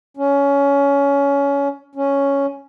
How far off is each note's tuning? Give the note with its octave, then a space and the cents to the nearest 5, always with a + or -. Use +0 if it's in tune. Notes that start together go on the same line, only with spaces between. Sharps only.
C#4 +20
C#4 +5